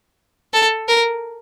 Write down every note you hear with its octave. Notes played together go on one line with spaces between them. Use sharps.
A4
A#4